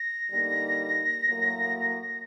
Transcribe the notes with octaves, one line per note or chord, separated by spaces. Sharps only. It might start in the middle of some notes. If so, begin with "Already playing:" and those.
Already playing: A#6
D3 G3 A#3 D#4
A2 F#3 A#3